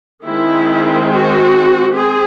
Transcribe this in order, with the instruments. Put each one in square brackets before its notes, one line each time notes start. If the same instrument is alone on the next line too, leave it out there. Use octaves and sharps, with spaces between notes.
[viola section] D#3 G#3 C4 E4
F#4
C4 G#4